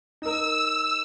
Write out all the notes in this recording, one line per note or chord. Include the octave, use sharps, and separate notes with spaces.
D#4 A#4 E6